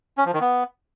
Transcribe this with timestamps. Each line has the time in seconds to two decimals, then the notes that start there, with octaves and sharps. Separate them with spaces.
0.18 C#4
0.25 F3
0.33 D#3
0.41 B3